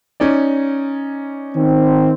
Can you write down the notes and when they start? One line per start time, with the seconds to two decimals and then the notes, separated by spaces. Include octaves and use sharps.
0.20 C#4 D#4 D5
1.55 D#3 C4